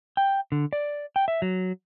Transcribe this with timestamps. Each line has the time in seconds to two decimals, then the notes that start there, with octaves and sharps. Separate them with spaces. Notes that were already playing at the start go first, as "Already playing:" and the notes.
0.17 G5
0.52 D3
0.73 D5
1.16 G5
1.28 E5
1.42 F#3